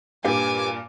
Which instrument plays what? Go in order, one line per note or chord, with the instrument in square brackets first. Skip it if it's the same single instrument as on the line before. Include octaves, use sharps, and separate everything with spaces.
[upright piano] G2 A#2 [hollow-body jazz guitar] G4 B4 F5 [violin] G#5 D6